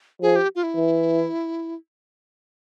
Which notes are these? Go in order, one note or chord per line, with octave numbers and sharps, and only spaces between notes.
F3 G#4
G4
F4
E4
E3